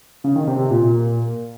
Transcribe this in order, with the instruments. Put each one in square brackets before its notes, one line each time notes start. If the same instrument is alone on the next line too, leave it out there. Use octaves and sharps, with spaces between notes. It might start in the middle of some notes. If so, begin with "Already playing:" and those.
[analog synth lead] C#3
D#3
C3
C3
A#2